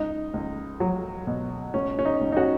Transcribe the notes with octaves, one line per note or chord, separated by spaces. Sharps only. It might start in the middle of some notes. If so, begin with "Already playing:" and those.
Already playing: C#2 D#4
C#2
F#3
B2
C#2 C#4
C#4
D#4
C#2
D#4
C#4 F#4